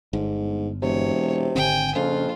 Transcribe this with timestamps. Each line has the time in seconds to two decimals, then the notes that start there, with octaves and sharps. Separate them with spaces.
0.13 G1 G#2
0.82 E1 C3 C#5
1.55 G#1 D3 C4 G5 G#5
1.95 A#1 F2 C#3 F4